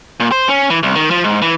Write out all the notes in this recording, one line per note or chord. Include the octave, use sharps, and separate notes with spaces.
A#2
C5
C#4
E3
C2
D#3
F3
G#2
E3